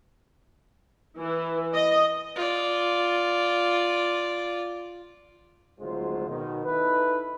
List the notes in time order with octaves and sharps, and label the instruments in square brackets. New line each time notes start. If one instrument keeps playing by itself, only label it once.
[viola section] E3
D#5
[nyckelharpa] F4 D5
[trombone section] G#1 D2 F#3 G#3 F4 C5
B2 D#3
D#4 E4 A4 B4